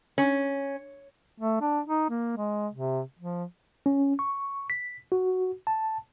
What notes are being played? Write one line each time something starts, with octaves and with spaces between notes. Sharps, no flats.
C#4
A3
D4
D#4
A#3
G#3
C3
F3
C#4
C#6
B6
F#4
A5